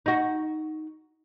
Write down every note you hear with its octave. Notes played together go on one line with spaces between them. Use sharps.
D#4 F#4